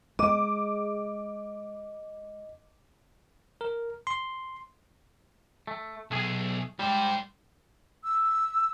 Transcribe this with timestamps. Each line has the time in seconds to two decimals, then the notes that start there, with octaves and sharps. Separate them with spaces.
0.19 G#3 D#5 D6
3.61 A#4
4.07 C6
5.67 A3
6.11 B1 A3 G#4
6.79 G#2 G3 C5
8.04 E6